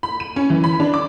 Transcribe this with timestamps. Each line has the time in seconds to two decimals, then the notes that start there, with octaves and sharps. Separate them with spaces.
0.03 B5
0.20 D#7
0.36 C#4
0.50 E3
0.64 B5
0.80 D4
0.94 D6